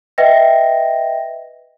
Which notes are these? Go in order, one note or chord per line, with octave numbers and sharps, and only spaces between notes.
B4 D#5 E5 G5 A#6